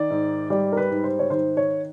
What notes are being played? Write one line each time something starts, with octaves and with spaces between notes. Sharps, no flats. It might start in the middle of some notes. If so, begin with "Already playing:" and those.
Already playing: D#3 D5
G#2
G3 D5
A#4
B4
G#2
C5
C#5
D#3 C5
C#5